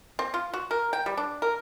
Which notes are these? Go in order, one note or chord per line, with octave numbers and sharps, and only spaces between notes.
C4
F4
F#4
A#4
G5
G3
D4
A#4